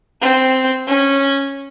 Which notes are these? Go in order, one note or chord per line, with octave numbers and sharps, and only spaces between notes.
C4
C#4